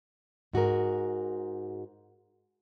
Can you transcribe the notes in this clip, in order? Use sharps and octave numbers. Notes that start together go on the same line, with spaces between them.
G#2 F#4 G#4 A#4